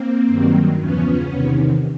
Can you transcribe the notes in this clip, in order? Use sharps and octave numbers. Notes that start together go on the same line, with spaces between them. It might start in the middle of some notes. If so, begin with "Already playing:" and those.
Already playing: A#3 C4
G2 D#3 F#3
E2 C#3 F3 B3 C#4
E2 C3 D#3